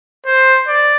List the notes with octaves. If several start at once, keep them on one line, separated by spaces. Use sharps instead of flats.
C5
D5